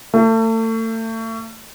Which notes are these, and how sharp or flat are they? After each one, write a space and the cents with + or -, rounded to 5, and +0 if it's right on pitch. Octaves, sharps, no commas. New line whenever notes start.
A3 +35